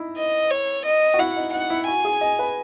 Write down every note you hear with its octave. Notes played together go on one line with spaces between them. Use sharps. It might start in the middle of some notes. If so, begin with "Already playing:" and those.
Already playing: D#4 E4
D#5
C#5
D#5
F#4
E4 F#5
D#4
D#4 F#5
E4
F#4 G#5
G#4
D#5
B4